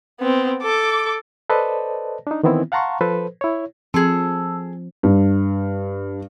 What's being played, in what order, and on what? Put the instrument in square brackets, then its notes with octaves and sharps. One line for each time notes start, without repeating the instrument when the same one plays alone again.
[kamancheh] B3 C4
A4 D6
[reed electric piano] A4 B4 C5 D5 D#5 A5
D4 D#4
D#3 E3 B3 C4 E4
F5 F#5 A5 A#5 C6 C#6
F3 A4 B4 C5
E4 C#5
[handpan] F3 [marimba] C4 [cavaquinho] G#4 A4 [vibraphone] A5 E6
[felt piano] G2